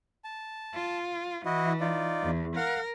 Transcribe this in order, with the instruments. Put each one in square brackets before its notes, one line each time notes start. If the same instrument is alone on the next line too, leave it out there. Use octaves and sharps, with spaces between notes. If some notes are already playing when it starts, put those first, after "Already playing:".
[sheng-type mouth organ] A5
[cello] F4
[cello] E3 [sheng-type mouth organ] E4 F#4 D#5
[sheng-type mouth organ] D#4 F4 D5
[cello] E2
[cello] A#4 [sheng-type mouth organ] F5 F#5